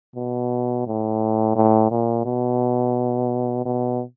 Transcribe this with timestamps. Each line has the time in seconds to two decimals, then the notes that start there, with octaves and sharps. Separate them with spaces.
0.16 B2
0.87 A2
1.56 A2
1.91 A#2
2.25 B2
3.65 B2